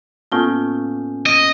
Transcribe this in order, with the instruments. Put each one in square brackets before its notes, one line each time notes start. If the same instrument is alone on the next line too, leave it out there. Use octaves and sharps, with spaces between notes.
[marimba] A2 F4 A5 [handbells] A#3 B3 C#4
[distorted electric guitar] D#5